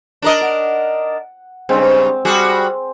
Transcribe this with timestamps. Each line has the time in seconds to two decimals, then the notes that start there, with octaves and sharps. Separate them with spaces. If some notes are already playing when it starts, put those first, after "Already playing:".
0.22 D4 A#4 D#5
0.41 F#5
1.69 G2 C#3 G#3 C4
2.25 G3 F#4 G#4